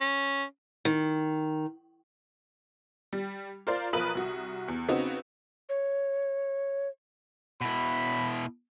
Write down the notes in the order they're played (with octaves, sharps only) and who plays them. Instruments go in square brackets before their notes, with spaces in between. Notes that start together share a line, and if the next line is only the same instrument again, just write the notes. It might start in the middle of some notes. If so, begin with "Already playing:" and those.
[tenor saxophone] C#4
[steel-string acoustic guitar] D#3
[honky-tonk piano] G3
F4 A#4 C5 D5 F5
B1 F3 A#4 B4 D#6 F#7
C2 F#4
E2
C#3 B3 C4 D#4 F#4
[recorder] C#5
[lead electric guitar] B2 E4 [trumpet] B5